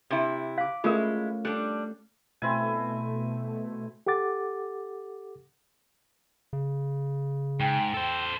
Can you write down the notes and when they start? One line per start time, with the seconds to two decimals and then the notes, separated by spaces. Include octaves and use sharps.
0.10 C3 E4
0.58 F5 D6 F#6
0.84 G#3 A3 C#4 E4 F4 A#4 F5
1.45 G3 D4 A4 F#6 G6
2.42 B2 A3 C4 E4 G#5
4.07 G4 A4 F#5 D6 A6
6.53 C#3
7.60 G#2 G5
7.94 A4 C5